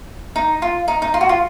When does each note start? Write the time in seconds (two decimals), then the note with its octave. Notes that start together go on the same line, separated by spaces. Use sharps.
0.36 D#4
0.62 F4
0.88 D#4
1.02 D#4
1.14 F4
1.21 F#4
1.29 F4